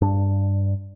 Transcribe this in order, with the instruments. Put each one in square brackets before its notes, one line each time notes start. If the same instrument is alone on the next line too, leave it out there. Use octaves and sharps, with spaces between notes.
[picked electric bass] G2 D4